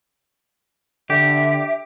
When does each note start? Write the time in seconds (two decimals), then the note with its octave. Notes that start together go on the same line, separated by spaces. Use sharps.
1.10 D3 G4 E5